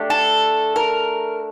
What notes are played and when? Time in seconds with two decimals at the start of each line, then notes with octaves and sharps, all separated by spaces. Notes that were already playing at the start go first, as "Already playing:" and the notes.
Already playing: A3 D4 G4
0.10 A4
0.76 A#4